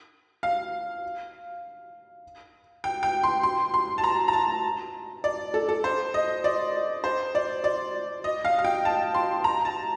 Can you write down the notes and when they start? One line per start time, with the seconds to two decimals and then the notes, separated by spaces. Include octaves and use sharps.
0.43 F5
2.84 G5
3.03 G5
3.23 C6
3.43 C6
3.74 C6
3.98 A5
4.04 A#5
4.28 A#5
4.33 A5
5.24 D5
5.54 A4
5.69 A4
5.84 C5
6.14 D#5
6.44 D5
7.04 C5
7.35 D5
7.64 D5
8.24 D#5
8.45 F5
8.59 F5
8.65 G5
8.85 A5
9.14 C6
9.44 A#5
9.65 A5